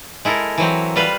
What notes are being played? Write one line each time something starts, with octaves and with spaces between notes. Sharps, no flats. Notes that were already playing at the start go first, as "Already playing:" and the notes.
G#3 E4 A4 A#4
E3 F#3 C4
G3 F4 B4 C5 F5